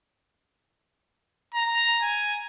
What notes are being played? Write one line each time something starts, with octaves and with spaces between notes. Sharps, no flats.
A#5
G#5